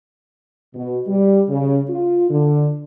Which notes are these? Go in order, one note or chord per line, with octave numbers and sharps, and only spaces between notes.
B2
G3
C#3
F4
D3